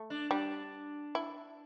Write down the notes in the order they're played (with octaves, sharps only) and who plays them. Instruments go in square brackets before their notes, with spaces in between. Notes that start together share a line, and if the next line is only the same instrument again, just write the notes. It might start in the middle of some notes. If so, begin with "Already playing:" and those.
Already playing: [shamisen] A3
[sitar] D4
[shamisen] G3 [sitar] D4
[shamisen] E4